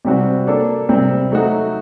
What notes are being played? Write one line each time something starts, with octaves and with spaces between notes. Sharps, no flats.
C3 G3 C4 F#4
A#3 D4 A4
C3 G3 C4
F#3 A3 D#4 F#4